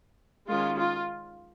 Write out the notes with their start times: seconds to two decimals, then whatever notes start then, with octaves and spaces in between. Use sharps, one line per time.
0.47 D#3 G#3 C#4 F4
0.77 F4